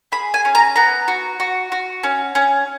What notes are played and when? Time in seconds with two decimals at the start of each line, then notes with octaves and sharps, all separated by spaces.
0.12 G#4 B5
0.34 G#5
0.45 C#4
0.55 A#5
0.76 B3 A#5
1.08 F#4
1.40 F#4
1.72 F#4
2.03 C#4
2.35 C#4